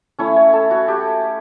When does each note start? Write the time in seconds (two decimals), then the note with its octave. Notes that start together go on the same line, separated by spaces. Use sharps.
0.19 A3 C#4 E4 C#5
0.36 C#5
0.53 A4
0.71 F#4
0.88 G4